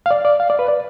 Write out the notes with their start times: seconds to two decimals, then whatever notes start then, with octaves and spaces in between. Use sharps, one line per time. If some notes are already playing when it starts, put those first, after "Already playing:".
0.06 F5
0.11 D5
0.25 D5
0.40 F5
0.50 D5
0.59 B4
0.68 D5